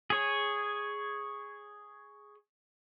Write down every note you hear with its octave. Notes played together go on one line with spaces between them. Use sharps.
G#4 C#5